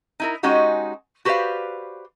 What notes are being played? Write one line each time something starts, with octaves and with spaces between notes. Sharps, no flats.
D#4 E4 A#4
G#3 C#4 D#4 F#4 G4
F#4 G4 B4 C5 D5 F5